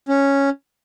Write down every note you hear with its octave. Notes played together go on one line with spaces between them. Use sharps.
C#4